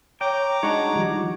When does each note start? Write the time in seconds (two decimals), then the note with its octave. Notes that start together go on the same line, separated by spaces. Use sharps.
0.21 C#5 G5 A#5 D6
0.63 G#3 D4 D#4 F#4 C#5
0.96 D#3 F3 G3